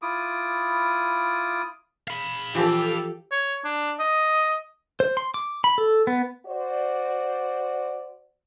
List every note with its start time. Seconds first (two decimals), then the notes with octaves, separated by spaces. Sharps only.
0.02 E4 F4 D6 D#6
2.08 F5 B5
2.55 E3 F3 F4 G4 A4
3.31 C#5
3.64 D4
3.99 D#5
5.00 C5
5.17 C6
5.34 D6
5.64 B5
5.78 A4
6.07 B3
6.46 F#4 C5 D5